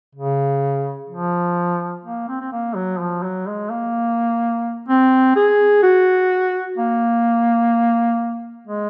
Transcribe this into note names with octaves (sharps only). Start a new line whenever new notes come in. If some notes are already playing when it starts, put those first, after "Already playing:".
C#3
F3
A#3
C4
C4
A#3
F#3
F3
F#3
G#3
A#3
C4
G#4
F#4
A#3
G#3